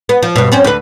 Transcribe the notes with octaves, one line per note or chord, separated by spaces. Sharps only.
B3
F3
G2 B2
F#2 C4 C#4
D2 B4